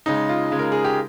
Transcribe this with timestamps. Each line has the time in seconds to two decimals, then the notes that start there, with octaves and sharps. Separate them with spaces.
0.06 C#3 G#3 D#4
0.29 F4
0.52 C#3 G#3
0.59 A#4
0.72 G#4
0.84 G4